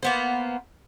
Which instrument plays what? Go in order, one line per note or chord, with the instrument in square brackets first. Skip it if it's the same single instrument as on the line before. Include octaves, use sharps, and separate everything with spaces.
[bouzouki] A#3 B3 C5